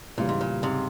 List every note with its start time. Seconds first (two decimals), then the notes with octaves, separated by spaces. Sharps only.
0.18 E2 A#2 C#3 G3
0.29 G#2
0.41 A#2
0.63 G#2 C3